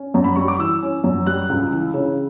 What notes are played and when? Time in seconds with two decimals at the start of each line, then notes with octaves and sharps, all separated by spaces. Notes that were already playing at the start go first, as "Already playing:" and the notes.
Already playing: C#4
0.14 F#2
0.24 B5
0.36 G3 C#6
0.48 D6
0.59 E3 E6
0.82 C#4
1.04 F#2
1.26 G3 F#6
1.49 C#2
1.73 E3
1.94 C#3